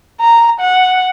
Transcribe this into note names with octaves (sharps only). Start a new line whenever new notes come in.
A#5
F#5